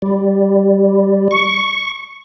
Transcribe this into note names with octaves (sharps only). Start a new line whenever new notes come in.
G3
C#6